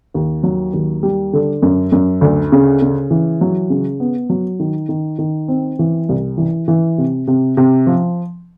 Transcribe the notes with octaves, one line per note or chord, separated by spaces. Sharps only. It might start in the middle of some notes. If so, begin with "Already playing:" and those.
D#2
F#3
D#2
G3
D3
F#2
F#2
D2
C#3
C#3
E3
F#3
C#3
B3
F#3
D#3
D#3
D#3
C4
E3
C2
E3
E3
C3
C3
C3
F3